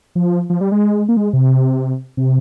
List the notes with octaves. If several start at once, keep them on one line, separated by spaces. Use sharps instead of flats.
F3
F3
G3
G#3
A#3
G#3
C3
C3